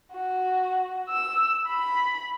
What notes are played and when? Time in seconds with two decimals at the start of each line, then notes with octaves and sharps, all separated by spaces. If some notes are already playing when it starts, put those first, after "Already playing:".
0.13 F#4
1.09 E6
1.68 B5